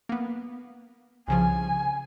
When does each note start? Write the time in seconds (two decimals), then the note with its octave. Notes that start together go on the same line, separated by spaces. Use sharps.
0.09 A#3 B3
1.28 C2 C#3 F3 G#5